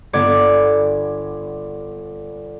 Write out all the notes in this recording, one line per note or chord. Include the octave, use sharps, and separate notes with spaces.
G1 B3 D5 G#6